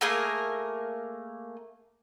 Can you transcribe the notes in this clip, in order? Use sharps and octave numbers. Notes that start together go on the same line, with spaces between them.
A3 A#3 G#4 A#4